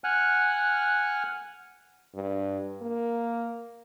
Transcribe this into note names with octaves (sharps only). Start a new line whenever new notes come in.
F#5 G#5 F6 F#6
G2
A#3